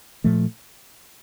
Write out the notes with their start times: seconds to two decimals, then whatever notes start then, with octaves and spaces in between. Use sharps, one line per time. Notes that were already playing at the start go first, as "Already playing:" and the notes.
0.24 A#2 F3 A3